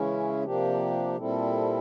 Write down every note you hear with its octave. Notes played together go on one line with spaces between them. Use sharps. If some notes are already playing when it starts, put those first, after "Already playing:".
Already playing: C#3 E3 G#3 C#4 E4
C3 F3 A#3 D4 G4
A#2 G3 C4 E4 A4